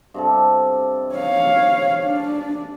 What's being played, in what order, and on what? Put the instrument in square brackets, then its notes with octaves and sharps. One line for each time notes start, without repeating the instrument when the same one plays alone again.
[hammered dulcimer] G2 C3 A4
[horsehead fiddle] C#5 F5
D4